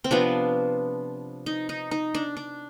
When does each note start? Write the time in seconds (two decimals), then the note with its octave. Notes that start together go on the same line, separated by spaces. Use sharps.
0.04 C4
0.11 C3 F3 B3 D4
1.46 D#4
1.69 D#4
1.91 D#4
2.15 D4
2.37 D4